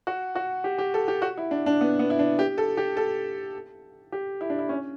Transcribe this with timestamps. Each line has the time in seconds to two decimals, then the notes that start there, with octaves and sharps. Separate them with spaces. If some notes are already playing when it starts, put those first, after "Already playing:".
0.07 F#4
0.35 F#4
0.64 G4
0.78 G4
0.94 A4
1.08 G4
1.22 F#4
1.37 E4
1.51 D4
1.66 D4
1.81 B3
1.99 B3
2.10 E4
2.19 D4
2.39 G4
2.58 A4
2.77 G4
2.97 A4
4.12 G4
4.41 E4
4.50 D4
4.59 E4
4.69 C#4